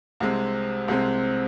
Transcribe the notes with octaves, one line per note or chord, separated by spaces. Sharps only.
C2 C3 G#3 C4
C2 C3 G#3 C4